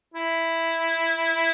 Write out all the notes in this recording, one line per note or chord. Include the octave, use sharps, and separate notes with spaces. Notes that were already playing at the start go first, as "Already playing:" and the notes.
E4